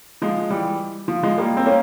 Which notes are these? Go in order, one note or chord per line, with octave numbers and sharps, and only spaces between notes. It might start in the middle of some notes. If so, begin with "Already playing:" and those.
F3 G#3
E3 G3
F3
F3 G#3
G3 A#3
C4
A#3 C#4